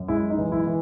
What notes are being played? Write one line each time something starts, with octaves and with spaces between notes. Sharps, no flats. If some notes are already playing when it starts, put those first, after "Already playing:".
Already playing: F#2
G#3 E4
D#4
E3
E4
E3